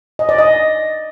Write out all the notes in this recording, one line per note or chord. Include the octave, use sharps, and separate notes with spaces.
D#5
D5
D#5